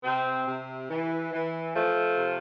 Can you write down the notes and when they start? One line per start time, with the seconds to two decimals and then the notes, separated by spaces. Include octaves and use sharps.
0.04 C3 C4
0.47 C3
0.90 E3
1.33 E3
1.75 F3 A3
2.18 C3